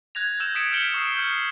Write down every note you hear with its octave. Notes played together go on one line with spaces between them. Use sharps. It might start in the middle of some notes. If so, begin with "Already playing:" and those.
F#6 G#6 A#6 F7
E6 G6 G#6 E7
D#6 G#6 B6 C#7 D7 E7
F6 G6 C#7 D7 F#7 G7
C#6 D#6 C7
F6 G6